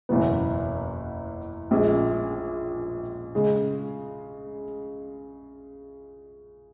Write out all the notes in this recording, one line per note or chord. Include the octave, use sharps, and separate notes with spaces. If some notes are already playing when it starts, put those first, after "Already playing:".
F#1 E2 B2 F#3 B3
A#1 A#2 G#3 C#4 G#4
C#3 G#3